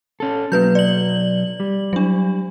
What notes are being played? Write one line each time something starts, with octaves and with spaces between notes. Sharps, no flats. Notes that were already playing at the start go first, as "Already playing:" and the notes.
C#4 A4
B1 F#3 A#3 B4 G6
D5 F#7
G3
F#3 D4